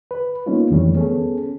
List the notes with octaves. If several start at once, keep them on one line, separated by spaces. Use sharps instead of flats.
B4
G3 A#3 B3 C#4 D#4 F4
F2 D#3 E3 G3 A3 C#4
B3 C#4 G#4 A4